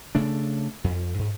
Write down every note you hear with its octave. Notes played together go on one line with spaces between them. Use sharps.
C#3 A3 D4
F2
G#2